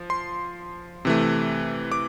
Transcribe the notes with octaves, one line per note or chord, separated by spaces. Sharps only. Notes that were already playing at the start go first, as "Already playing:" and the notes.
Already playing: F3
C6
C3 E3 A3
D6